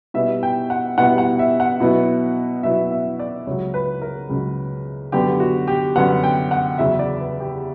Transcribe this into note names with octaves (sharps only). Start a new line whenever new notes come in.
B2 G3 B3 E4 E5
G5
F#5
B2 G3 B3 E4 F#5
F#5
E5
F#5
B2 F#3 B3 E4
B2 F#3 B3 E4 E5
E5
D5
C#2 C#3 F#3 C#5
B4
A#4
C#2 C#3 F#3
F#2 D3 F#3 B3 G4
F#4
G4
F#2 D3 F#3 B3 F#5
G5
F#5
E2 C#3 F#3 E5
D5
B4
G4